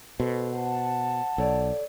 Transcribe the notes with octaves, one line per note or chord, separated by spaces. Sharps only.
B2 A4 C5
C5 F#5 A5
B1 A4 C#5 D5